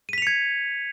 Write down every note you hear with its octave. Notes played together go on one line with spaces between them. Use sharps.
G#6 B6 C#7 D#7 F7